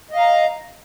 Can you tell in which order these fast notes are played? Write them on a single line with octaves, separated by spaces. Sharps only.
D#5 F5 A#5